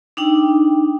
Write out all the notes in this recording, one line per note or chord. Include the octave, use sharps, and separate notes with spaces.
D4 D#4 G5